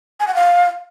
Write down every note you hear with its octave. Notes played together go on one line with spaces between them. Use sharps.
G#5
F#5
F5